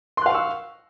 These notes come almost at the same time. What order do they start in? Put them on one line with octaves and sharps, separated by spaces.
C6 F#6 F5 C#6 E6